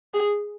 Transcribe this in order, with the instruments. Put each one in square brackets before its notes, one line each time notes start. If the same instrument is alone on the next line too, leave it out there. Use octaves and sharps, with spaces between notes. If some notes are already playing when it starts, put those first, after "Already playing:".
[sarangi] G#4